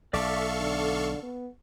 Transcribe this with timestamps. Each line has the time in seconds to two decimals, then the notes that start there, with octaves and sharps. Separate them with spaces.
0.13 B1 A4 D5 E5 F5 C#6 D6
0.61 D3
1.23 B3